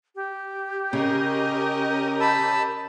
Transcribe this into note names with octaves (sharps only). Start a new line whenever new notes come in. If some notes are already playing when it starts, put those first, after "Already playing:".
G4
C#3 C#4 A#4 D#5
A5 B5 E6